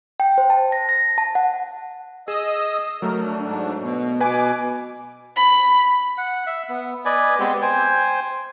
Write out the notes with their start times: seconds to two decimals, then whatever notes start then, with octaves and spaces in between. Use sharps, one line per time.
0.20 G5
0.38 C5
0.50 A5
0.72 A#6
0.89 A#6
1.18 A5
1.35 F#5
2.28 G#4 D#5 D#6 E6
3.02 F#3 A3 A#4
3.21 D4
3.43 G#2 D4
3.81 B2
4.20 B2 B4 G#5 D6
5.37 B5
6.18 F#5
6.47 E5
6.69 B3
7.05 B4 D5 D#5 G#5
7.39 G#3 B3 C4 G4
7.62 C5 G5 G#5